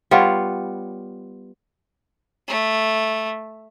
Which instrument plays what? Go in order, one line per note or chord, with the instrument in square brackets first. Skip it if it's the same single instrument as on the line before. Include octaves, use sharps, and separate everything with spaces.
[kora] G3 B3 F4 C#5
[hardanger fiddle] A3